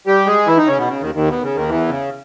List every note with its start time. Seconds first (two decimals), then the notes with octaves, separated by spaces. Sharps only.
0.07 G3 G4
0.26 G#3 G#4
0.47 E3 E4
0.57 D#3 D#4
0.67 C#3 C#4
0.78 B2 B3
0.88 C#3
1.01 D#2 D#3
1.15 D#2 D#3
1.28 B2
1.42 C#3
1.56 D#2 D#3
1.69 E2 E3
1.88 C#3